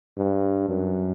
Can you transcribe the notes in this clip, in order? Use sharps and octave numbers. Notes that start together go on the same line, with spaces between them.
G2
F#2